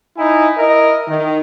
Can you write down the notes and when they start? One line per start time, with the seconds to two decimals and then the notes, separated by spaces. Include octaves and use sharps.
0.17 D#4 E4 G#5
0.56 E4 A#4 D#5
1.08 D#3